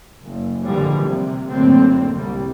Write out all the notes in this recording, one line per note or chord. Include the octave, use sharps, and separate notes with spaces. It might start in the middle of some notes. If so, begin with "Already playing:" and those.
F#1
A#1 G#2 D3 E3 F3 G3
C3
F#1 A2 D3 A#3 C4
C2 G3